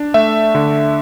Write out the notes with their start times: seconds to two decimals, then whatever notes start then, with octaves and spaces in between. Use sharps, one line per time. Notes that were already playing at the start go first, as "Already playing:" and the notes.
Already playing: D4
0.14 A3 E5
0.55 D3